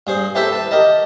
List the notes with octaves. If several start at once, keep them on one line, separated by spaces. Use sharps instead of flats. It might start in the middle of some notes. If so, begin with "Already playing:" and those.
G2 G#4 C5
E4 G4 A4 B4 C5 E5
B4 A5
G4 A#4 D#5 A5